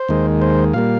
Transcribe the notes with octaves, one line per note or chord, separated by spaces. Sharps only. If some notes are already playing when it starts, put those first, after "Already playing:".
Already playing: C5
D#2 D#3 G#3
C5
A#2 G3 A#3 F5